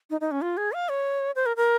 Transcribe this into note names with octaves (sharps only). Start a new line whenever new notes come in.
D#4
D#4
C#4
F4
G#4
F5
C#5
C5
A#4
A#4